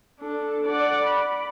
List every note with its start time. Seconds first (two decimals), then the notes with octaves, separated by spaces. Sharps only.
0.20 D4 A4
0.67 D5 F#5
1.05 B5